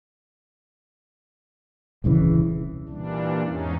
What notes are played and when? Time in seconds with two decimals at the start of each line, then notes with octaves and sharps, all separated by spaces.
2.04 D#1 C2 C#3 E3
2.89 A#2 E3 G3 D4
3.44 E2 G#2 C#4 D#4